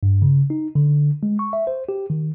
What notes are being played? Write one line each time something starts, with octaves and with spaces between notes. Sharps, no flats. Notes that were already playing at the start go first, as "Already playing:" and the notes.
G2
C#3
D#4
D3
G#3
C#6
E5
C5
G4
D#3